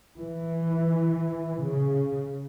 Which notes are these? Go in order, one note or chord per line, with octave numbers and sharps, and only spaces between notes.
E3
C#3